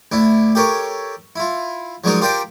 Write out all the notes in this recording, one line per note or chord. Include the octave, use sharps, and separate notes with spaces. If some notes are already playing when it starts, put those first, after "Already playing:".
D2 D4 E4
G4 A4 A#4 C#5
E4 F4
F3 F#3 G#3 D4 D#4 A#4
F4 G4 A#4 C5 D5 G5